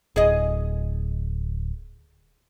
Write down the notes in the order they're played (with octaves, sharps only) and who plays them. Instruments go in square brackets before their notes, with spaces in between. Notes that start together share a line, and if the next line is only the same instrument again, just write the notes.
[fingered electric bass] D1 [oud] G#4 D#5